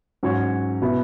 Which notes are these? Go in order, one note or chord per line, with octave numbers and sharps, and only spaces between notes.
G#2 F#3 C#4 F#4 C#5
B2 B3 E4